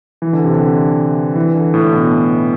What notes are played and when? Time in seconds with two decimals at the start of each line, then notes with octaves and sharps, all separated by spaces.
0.22 E3
0.33 D3
0.44 C3
0.55 D3
1.35 E3
1.55 D3
1.74 A2
1.93 B2